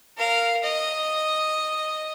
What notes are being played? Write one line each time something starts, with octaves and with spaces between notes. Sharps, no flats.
A#4 F5
D#5